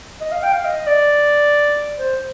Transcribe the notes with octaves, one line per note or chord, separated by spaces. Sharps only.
D#5
F5
G5
F5
D#5
D5
C5